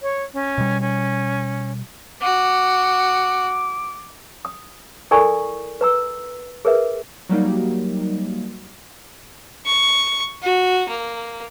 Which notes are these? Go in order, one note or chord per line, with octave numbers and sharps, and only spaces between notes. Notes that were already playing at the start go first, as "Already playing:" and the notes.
C#5
C#4
B2 G3
C#4
F#4 D6
D#6
E4 A4 A#4 D5 G#5 C#6
B4 A#5 E6
G#4 A#4 B4 E5
F#3 G3 A#3 D#4
C#6
F#4
A#3